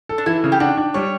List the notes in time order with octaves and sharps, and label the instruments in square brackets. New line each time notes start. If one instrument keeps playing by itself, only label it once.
[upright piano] A4
[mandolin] D4
[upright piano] E3 [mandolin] E4
[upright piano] C#3
[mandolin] G4
[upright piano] D4 [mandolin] F#4
[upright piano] D4
[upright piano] G3 [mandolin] C#5